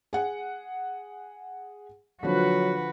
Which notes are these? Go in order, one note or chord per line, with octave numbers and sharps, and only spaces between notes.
G#4 F#5
D3 F3 F#3 F#4 B4